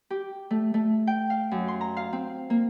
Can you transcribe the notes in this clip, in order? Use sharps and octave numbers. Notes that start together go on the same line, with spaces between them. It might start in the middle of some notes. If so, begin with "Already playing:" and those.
G4
A3
A3
G5
F5
F#2
C6
A#5
F5
C4
A#3